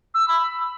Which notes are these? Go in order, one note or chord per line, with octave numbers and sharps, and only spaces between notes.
E6
B5